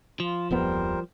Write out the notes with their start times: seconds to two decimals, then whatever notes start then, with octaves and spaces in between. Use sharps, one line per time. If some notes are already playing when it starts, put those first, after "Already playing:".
0.20 F3 F4
0.51 D1 F2 G3 B3 A#4 C5